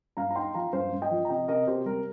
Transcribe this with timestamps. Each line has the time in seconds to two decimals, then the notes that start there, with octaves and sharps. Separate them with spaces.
0.17 G2 F5 A#5
0.30 A#5
0.35 D#4 G5 C6
0.54 F3 F5 A#5
0.73 G2 C5 F5
0.93 G2
1.02 D#5 G5
1.11 F3
1.25 A#5
1.29 C3 D#5 G5
1.48 C3 A#4 D#5
1.67 C3 G4 C5
1.86 G3 A#4